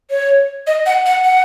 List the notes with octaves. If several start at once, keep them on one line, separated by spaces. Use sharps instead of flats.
C#5
D#5
F#5
F#5
F#5